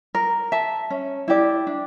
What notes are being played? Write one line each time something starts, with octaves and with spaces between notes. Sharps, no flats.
A#4
E5 A5
C#4
E4 G4 D5
D4